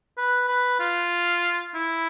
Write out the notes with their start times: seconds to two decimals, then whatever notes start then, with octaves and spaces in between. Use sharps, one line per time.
0.17 B4
0.48 B4
0.79 F4
1.74 E4